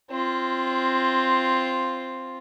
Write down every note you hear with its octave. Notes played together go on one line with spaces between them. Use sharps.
C4 F4